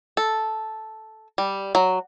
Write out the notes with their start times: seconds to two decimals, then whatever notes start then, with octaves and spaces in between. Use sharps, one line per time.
0.17 A4
1.38 G3
1.75 F#3